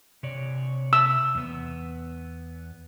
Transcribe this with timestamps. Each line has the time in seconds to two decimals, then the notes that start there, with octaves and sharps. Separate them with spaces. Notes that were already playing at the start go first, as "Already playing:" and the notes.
0.23 C3 C#5 D5
0.93 E6
1.35 E2 B3